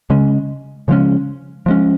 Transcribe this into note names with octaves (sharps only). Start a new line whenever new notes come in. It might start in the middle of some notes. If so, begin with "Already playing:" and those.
C#3 G#3 C#4
C#3 F3 G#3 C#4
F3 G#3 C#4